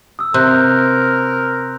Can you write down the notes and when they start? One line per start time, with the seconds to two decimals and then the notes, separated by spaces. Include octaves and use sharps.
0.19 D#6 E6
0.34 C3 A#4 C6 F#6 G6